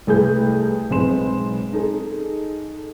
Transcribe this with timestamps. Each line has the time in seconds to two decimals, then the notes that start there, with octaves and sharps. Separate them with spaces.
0.07 C2 A3 G#4 A4 B4 G6
0.90 B1 G#3 C4 B4 C6 E7
1.73 D#4 G#4 A4